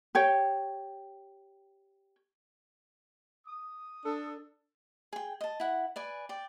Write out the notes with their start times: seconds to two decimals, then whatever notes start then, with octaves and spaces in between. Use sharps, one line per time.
0.15 G4 C#5 G5
3.46 D#6
4.04 D4 A4
5.13 G#4 G5
5.41 D#5 A5
5.60 E4 F#5
5.96 B4 D5 G#5
6.29 D5 G5